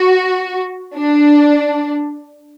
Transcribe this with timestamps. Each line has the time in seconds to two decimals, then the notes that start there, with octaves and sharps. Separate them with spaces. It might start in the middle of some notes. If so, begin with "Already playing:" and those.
Already playing: F#4
0.97 D4